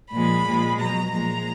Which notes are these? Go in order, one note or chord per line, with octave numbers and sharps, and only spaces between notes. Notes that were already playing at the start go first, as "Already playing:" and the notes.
A#2 F3 G#3 B5
A#2 F3 G#3
B2 F#3 A#5
A#2 F3 G#3 A#5